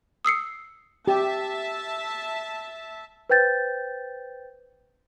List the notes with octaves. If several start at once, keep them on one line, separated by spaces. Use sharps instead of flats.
D#6 E6 C7 C#7
G4 E5 A5
B4 C5 G5 G6 A6